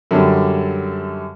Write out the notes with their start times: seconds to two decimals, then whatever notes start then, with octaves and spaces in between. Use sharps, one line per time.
0.11 F#2 D3 G3